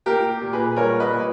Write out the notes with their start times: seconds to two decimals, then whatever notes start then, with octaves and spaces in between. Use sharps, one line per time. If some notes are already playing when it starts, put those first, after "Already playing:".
0.06 A#3 G4 A#4
0.41 A#2
0.53 G#4 B4
0.76 G3 A#4 C#5
1.00 B4 D#5
1.13 A#2